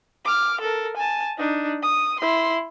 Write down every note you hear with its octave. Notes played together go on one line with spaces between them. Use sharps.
D6 F6
A4 A#4
G#5 A5
D4 D#4
D#6
E4 C6